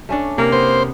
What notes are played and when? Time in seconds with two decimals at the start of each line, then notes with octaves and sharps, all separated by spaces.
0.09 A3 C#4 D4
0.38 C3 A#3 A#4
0.52 B3 C5